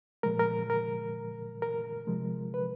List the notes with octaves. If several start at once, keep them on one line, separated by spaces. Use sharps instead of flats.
A#2 F3 G#3 A#4
A#4
A#4
A#4
C3 F3 G#3
B4